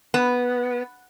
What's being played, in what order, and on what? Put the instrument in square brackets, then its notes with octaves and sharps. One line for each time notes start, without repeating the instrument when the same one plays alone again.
[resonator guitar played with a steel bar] B3